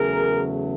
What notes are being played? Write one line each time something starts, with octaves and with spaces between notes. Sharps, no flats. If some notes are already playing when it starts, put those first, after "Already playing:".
Already playing: E2 C#3 F#3 A3 G#4 A#4